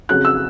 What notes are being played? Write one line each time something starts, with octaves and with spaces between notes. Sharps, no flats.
F2 C#3 F#3 F#6
E6